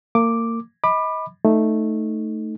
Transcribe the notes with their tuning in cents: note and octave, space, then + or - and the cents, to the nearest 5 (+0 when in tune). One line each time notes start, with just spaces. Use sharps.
A#3 -30 D6 +0
D#5 +35 B5 +0 D6 +30
A3 +0 D#4 +0